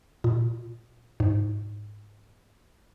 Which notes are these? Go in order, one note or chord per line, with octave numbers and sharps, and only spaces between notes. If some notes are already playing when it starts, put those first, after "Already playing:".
A#2
G#2